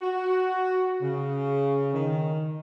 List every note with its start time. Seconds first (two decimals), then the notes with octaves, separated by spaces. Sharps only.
0.02 F#4
1.02 C#3
1.94 D#3